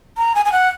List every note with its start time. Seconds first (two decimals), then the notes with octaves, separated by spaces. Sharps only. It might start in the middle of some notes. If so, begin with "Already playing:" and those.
0.17 A#5
0.35 G#5
0.45 G#5
0.52 F#5